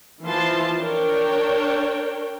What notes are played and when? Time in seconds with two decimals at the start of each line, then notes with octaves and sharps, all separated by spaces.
0.24 E3 F3 F4 A5 C6
0.79 D4 A#4 C#5 G5